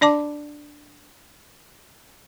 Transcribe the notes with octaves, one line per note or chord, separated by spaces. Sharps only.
D4 D5 A5 D6